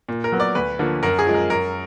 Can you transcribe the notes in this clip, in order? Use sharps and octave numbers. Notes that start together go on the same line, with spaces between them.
A#2
A#4
F#3 B3
D5
D2 B4
D3 F3 A#3
F#2 A#4
G#4
F3 G#3
A#4
F#2 A#4